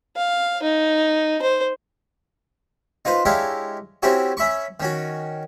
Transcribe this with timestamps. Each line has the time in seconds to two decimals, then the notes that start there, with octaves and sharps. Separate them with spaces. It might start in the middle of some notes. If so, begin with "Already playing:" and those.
0.16 F5
0.63 D#4
1.42 C5
3.05 D#4 F4 B4 C5
3.25 G#3 D4 E4 G4 C#5 F5
4.03 C4 C#4 E4 F#4 G4 C#5
4.37 C#4 E5 B5 C#6
4.80 D#3 C#4 F#4